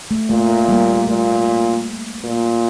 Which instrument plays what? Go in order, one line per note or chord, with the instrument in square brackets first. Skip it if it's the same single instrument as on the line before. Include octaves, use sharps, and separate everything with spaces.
[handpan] A3
[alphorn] A#2 [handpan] A3
[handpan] G3 A#3
[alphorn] A#2 [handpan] A3
[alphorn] A#2